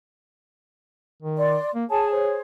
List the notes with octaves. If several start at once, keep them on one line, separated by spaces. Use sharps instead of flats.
D#3
D5 C6
A#3
G#4 C#5 G#5 A5
C5 C#5